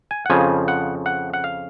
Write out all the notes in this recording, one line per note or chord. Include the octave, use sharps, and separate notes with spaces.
G#5
F#5
F2 C#3 F3 G#5
F#5
F#5
F#5
F5